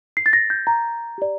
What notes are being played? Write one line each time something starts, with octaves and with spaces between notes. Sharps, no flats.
C7
A6
A#6
G6
A#5
G4 D5